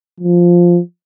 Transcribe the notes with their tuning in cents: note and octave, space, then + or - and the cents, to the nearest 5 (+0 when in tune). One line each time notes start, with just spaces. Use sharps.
F3 +0